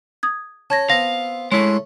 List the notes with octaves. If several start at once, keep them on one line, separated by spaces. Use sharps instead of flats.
D#6 G#6
C#4 A5 G#6 A#6
B3 C4 F5 A#6
G#3 A3 C#4 E4